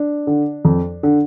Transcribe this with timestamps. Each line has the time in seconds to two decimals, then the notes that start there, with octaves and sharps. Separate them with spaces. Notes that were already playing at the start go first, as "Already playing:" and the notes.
Already playing: D4
0.27 D3
0.65 F2
1.03 D3